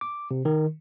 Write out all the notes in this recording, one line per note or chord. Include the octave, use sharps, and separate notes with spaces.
D6
C3
D#3